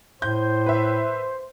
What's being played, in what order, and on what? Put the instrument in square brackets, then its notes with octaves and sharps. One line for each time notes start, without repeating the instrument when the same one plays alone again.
[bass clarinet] A2 [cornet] C5 [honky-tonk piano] G6
[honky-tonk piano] B4 E5